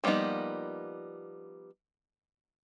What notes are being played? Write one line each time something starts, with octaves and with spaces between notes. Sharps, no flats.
F3 G3 A#3 B3 D#4